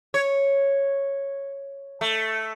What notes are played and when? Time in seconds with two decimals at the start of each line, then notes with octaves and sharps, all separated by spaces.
0.14 C#5
2.01 A3